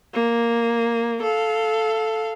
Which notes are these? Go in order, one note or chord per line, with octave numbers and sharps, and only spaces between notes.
A#3
A4 F5